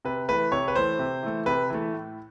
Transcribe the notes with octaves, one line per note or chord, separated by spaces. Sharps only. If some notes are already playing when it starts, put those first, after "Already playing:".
C3 B4
E3 A3 B4
C3 C#5
B4
E3 A3 C5
C3
E3 A3
C3 B4
E3 A3
A2